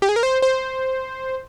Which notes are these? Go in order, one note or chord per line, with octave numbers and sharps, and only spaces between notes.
G4
G#4
A#4
C5
C5